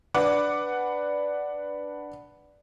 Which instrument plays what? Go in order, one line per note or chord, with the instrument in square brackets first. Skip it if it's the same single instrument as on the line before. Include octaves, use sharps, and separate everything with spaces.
[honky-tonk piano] D4 B4 F#5 D6